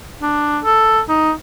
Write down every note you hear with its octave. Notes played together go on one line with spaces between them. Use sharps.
D4
A4
D#4